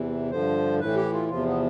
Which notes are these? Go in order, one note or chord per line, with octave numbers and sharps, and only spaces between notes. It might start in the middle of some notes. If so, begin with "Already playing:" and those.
Already playing: E2 C3 E3
G2 D3 F3 C5
A2 E3 B4
G4
F4
E2 C3 F3 F4
B3